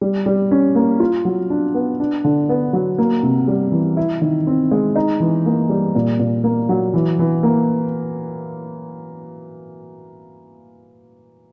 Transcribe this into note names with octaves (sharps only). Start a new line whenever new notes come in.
G3
G3
C#4
A#3
F4
F#3
D4
B3
D4
D3
B3
F#3
A#3
C3
G3
E3
E4
D#3
C4
G#3
D#4
E3
A#3
G3
A#2
A#2
A#3
F#3
E3
E3
A#3